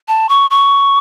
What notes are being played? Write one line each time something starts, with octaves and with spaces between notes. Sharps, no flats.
A5
C#6
C#6